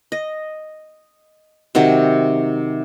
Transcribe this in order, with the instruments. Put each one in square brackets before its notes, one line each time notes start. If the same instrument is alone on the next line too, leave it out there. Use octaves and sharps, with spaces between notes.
[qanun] D#5
C3 D#3 F#3 G4